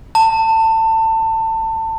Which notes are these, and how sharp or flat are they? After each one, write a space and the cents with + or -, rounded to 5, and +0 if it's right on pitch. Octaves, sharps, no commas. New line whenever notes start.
A5 +25